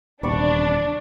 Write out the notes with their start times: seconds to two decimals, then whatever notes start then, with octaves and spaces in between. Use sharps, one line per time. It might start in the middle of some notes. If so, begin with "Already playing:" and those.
0.23 D#1 E2 C3 D4 D5 B5 C#6